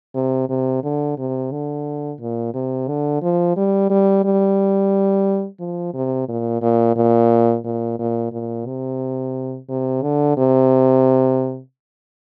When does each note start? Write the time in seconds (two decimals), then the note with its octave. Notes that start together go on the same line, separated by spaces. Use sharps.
0.15 C3
0.49 C3
0.84 D3
1.18 C3
1.51 D3
2.20 A#2
2.54 C3
2.88 D3
3.22 F3
3.57 G3
3.90 G3
4.24 G3
5.60 F3
5.94 C3
6.29 A#2
6.62 A#2
6.96 A#2
7.65 A#2
7.99 A#2
8.32 A#2
8.66 C3
9.69 C3
10.03 D3
10.37 C3